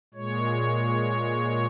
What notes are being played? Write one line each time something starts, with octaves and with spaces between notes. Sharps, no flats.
A#2 G#3 C#5